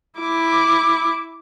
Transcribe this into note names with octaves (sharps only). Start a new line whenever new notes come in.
E4 D6